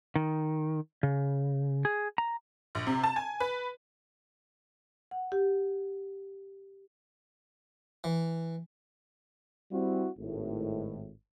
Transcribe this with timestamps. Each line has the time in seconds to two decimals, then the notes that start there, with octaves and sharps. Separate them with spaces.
0.16 D#3
1.03 C#3
1.85 G#4
2.18 A#5
2.75 A#1
2.87 C3
3.04 A5
3.16 G#5
3.40 B4
5.11 F#5
5.32 G4
8.04 E3
9.72 G3 C4 E4 F#4
10.18 G#1 A2